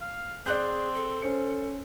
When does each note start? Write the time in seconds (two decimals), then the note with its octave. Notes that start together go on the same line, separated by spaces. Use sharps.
0.01 F5
0.46 C4 G#4 D5 F#6 G6
0.95 A4
1.22 C#4 C5 C#7